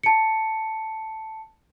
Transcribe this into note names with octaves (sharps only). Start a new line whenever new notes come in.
A5 C#7